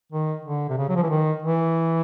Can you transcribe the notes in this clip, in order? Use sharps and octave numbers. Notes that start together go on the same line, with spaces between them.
D#3
D3
C3
C#3
F#3
F3
E3
D#3
E3